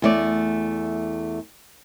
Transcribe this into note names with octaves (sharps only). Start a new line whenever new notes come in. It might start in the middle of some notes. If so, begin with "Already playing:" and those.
E2 A3 D5